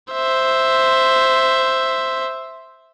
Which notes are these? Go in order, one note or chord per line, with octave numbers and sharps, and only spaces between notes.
C5 E5